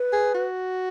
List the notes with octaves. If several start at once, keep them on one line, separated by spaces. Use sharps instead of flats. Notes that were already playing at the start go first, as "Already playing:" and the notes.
Already playing: B4
G#4
F#4